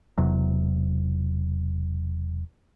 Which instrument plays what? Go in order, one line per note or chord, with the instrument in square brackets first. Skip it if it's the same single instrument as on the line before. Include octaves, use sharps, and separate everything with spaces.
[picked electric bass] E1 E2 C3 F#3